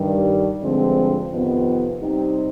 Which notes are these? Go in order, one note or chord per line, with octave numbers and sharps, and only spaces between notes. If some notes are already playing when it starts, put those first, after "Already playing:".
Already playing: G2 D#3 G3
G2 D3 F3 G#3 C4
F2 C3 D#3 B3 F4
C3 G3 C4 D#4